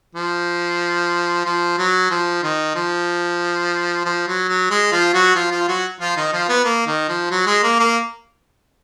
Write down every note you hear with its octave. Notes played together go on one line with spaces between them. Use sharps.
F3
F3
F#3
F3
D#3
F3
F3
F#3
F#3
G#3
F3 F4
F#3 F#4
F3 F4
F3 F4
F#3 F#4
F3 F4
D#3 D#4
F3 F4
B3
A#3
D#3
F3
F#3
G#3
A#3
A#3